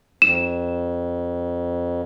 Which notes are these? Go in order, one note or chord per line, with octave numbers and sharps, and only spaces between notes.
F2 E7